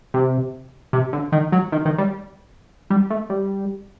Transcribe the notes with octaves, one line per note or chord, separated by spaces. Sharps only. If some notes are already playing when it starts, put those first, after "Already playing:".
C3
C3
D3
D#3
F#3
D#3
D#3
G3
G3
A3
G3